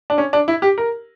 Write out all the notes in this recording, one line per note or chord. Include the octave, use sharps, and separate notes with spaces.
D4
C#4
D4
E4
G4
A#4